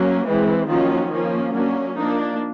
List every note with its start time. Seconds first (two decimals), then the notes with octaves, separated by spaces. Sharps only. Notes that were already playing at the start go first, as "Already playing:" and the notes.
Already playing: F#3 A#3 C#4
0.26 E3 G#3 C4
0.68 D#3 F3 F#3 A#3 C#4 F4
1.12 F3 A#3 C#4
1.54 F#3 A#3 C#4 D4
1.96 F3 A#3 D4 D#4